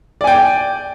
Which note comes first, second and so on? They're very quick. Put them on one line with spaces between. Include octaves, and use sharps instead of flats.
D5 G#5 G5